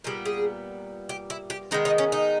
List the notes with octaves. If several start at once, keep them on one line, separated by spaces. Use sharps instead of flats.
A#2 G3 B3 G#4
G#4
G4
E4
G4
D#3 G#3 B3 D#4
D#4
C#4
D#4